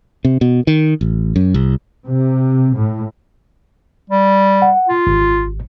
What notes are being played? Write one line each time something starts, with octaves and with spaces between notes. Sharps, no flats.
C3
B2
D#3
A1
F#2
C2
C3
A2
G3
F#5
F4
G#1